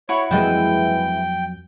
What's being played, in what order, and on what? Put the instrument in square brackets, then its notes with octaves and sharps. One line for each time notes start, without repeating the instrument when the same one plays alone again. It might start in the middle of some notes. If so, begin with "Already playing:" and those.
[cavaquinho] E4 F#4 B5 [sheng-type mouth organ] C#5
[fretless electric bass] F2 F#3 A#3 [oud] E3 G#3 C4 [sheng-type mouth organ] G5